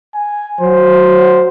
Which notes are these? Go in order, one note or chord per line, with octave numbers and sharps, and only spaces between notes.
G#5
F#3 C5